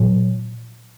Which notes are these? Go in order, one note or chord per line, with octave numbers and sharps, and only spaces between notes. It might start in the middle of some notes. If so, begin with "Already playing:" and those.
Already playing: A#2 F#3